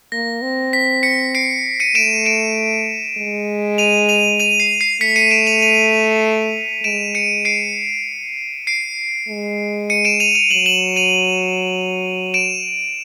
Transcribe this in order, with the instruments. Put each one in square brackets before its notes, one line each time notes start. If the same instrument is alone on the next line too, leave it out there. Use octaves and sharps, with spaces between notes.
[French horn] A#3 [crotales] A#6
[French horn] C4
[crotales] B6
B6 C#7
C7 D7
C#7 D#7
[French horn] A3 [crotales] D7 E7
[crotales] D7 E7
[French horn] G#3
[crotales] D#7 F7
D#7 F7
D#7 F7
C7
C7
[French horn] A3 [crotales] B6 C#7
[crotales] C#7 D#7
D7 E7
D#7 F7
D#7 F7
[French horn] G#3 [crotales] D7 E7
[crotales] C#7 D#7
C7 D7
C7 D7
[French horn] G#3
[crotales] C#7 D#7
D7 E7
D#7 F7
D#7 F7
[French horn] F#3 [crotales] E7 F#7
[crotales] E7 F#7
D#7 F7
D7 E7